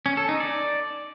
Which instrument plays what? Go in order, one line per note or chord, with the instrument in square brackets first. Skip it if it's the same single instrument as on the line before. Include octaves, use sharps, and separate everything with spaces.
[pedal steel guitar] C#4
A4
D#4
D5